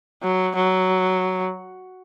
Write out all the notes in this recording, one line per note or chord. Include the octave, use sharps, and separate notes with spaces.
F#3
F#3